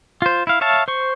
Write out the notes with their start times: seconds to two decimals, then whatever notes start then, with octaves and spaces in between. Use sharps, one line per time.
0.22 F4 C5
0.47 E4 F5
0.61 C#5 E5 F5 A5
0.88 C5 C#6